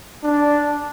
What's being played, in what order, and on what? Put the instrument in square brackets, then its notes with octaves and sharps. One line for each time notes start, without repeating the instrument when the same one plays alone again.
[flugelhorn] D4